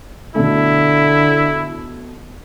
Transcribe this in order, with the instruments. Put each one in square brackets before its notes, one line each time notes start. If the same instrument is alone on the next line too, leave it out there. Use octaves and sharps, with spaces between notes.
[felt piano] B2 A3 [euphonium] D3 [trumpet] E4